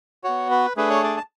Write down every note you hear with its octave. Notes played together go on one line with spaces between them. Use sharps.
B3 F#4 C#5
B4
A3 D4 G#4 B4
C#5
D5
A5